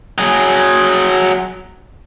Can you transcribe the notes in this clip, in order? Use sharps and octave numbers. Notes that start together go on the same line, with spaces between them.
F#3 G#4